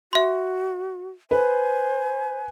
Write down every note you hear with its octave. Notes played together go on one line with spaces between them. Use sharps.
F#4 E5 C6
B4 C5 G#5